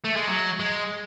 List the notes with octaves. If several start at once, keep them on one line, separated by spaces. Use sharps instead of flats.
A3
G#3
F#3
G#3